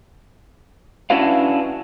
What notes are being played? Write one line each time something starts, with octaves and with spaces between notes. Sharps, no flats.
C#4 D4 E4 F#4 B4 F5